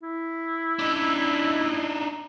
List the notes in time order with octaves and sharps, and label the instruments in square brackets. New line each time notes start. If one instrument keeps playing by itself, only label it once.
[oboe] E4
[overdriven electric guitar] D4 D#4